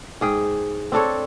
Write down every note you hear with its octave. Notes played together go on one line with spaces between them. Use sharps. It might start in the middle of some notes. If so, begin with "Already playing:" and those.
G#2 G#4 G5
C4 D4 A4 C#5